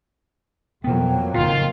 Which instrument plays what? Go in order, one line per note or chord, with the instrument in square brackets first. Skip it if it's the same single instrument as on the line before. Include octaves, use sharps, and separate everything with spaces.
[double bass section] F2 F#3 A#3 [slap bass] B2 B3 [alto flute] G5
[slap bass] F#1 A2 [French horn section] D#3 F4